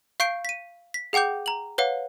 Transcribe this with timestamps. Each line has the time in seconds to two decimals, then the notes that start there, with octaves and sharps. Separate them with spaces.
0.20 F5 C#6 G6 C7 D7
0.45 B6 D#7
0.94 B6
1.13 G#4 F#5 G5 D6 G6
1.46 A#5 F#7
1.78 B4 C#5 F5 F#5